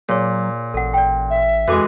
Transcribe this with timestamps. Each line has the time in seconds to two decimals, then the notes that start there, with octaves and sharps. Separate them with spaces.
0.09 A#2 F#3 G#4 C#5
0.74 A1 A4 F#5
0.94 D5 G5
1.30 E5
1.68 F2 E3 G#3 F#4 A4 D6